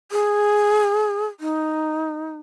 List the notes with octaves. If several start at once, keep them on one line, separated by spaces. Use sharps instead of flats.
G#4
D#4